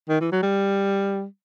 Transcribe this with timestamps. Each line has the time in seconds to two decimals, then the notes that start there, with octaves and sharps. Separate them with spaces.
0.09 D#3
0.21 E3
0.32 F#3
0.43 G3